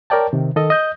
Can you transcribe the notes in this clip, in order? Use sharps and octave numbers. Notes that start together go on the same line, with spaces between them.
A#4 C#5 D5 G5 A5
C3 D#3
D#3 A4 D#5
D#5 G6